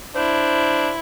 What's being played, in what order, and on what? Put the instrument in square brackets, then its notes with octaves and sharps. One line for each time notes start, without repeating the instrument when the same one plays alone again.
[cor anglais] D4 [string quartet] E4 [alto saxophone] C5